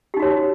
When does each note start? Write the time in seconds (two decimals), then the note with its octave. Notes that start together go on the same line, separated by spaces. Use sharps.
0.14 G4
0.17 D#4
0.20 F#4
0.22 C#5